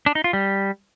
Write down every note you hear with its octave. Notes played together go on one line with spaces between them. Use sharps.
D4
D#4
F4
G3